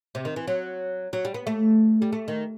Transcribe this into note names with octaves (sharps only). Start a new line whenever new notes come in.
C3
D#3
E3
F#3
F#3
G3
B3
A3
G3
A3
D#3